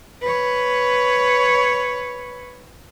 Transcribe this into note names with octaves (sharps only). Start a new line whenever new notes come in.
B4 C#5